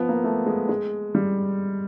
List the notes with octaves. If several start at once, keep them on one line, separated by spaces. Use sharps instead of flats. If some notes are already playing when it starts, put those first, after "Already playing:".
Already playing: F3 B3
A#3
A3
G#3
G#3
G3